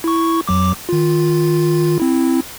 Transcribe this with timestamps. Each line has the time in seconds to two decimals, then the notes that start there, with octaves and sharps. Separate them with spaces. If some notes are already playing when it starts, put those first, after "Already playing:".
0.04 E4 C#6
0.48 F2 F#3 D6
0.89 D#3 F4
2.00 C4 E4